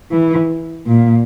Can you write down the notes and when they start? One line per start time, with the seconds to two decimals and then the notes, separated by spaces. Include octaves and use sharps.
0.12 E3
0.87 A#2